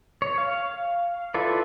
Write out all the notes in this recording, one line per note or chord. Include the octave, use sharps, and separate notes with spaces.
C#5
F5
E4 F4 A4 B4 D5